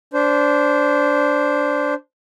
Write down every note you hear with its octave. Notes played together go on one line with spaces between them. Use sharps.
D4 C5